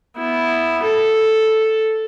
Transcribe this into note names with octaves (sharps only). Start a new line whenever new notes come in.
B3 E4
A4